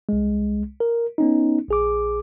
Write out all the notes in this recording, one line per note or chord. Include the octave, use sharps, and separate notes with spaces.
C2 G#3
A#4
B3 C#4 D#4
A#1 G#4 D6